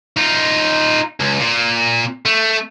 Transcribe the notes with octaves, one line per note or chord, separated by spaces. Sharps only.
D#4 F4
C#2
A#2
A3